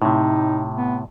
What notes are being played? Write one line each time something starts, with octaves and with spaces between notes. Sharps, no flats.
A2 C3 D#4
B3